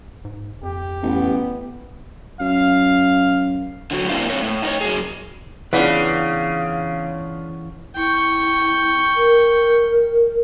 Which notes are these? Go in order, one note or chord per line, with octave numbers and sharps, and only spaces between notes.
G#2
F2 G4
A1 B3
F#2 F5
D3 F#3 F#4
A#3 C4 D4 E4 C5 F5
G#2 C4 C#5 E5
A2
D#4 C5 C#5
F#3 G#4
C#3 E3 B3 D4 F4
E4 G5 C#6
A#4